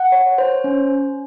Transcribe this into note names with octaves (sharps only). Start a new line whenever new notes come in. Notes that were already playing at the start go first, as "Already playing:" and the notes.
Already playing: F#5
C#5
C5
C#4